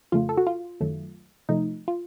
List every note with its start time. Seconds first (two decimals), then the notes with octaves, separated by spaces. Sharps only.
0.12 F2 C#3 A3 F4
0.29 A4
0.38 F#4
0.47 F4
0.80 F#2 D#3 F#3 A3
1.49 C3 F3 A3 D#4
1.88 F4